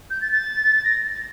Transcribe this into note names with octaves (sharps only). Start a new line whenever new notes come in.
G6
A6
A6
A6
A#6